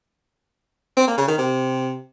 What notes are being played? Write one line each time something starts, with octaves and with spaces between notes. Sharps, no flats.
C4
A#3
C#3
D#3
C3